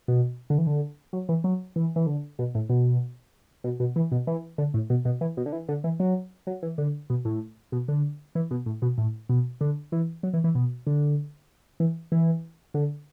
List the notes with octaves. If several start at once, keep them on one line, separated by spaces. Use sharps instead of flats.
B2
D3
E3
D3
F#3
E3
F#3
E3
E3
D3
B2
A2
B2
B2
B2
E3
B2
E3
D3
A2
B2
B2
E3
B2
D3
E3
D3
E3
F#3
F#3
E3
D3
B2
A2
B2
D3
E3
B2
A2
B2
A2
B2
D3
E3
F#3
E3
E3
B2
D3
E3
E3
D3